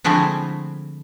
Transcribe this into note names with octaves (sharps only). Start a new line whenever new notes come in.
D3 F3 G#3 A3 C4 E4